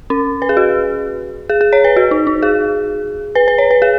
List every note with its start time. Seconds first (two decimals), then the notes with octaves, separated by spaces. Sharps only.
0.10 C#4
0.42 B4
0.49 G#4
0.57 F#4
1.49 G#4
1.61 G#4
1.73 C#5
1.84 B4
1.96 F#4
2.11 D#4
2.27 D#4
2.43 G#4
3.35 B4
3.48 B4
3.58 C#5
3.71 B4
3.82 G#4